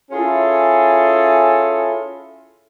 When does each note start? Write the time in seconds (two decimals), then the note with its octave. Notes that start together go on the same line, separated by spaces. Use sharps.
0.11 C#4 E4 F4 G#4 A4